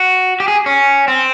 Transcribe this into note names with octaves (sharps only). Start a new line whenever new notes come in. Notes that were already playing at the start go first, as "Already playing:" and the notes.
Already playing: F#4
G4
G#4
C#4
C4